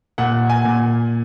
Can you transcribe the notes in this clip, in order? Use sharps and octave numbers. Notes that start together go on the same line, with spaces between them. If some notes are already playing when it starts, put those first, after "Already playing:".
A#2 F#5
G#5
A#2